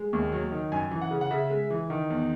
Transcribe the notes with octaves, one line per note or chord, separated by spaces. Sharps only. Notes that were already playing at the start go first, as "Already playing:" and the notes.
Already playing: G#3
D#2
F#3
D#3
F#2 G#5
E3
F#5
C#3
F#5
C#3 E5
G#3
E3
D#3
E2